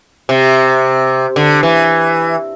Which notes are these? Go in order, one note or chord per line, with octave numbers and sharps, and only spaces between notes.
C3
D3
E3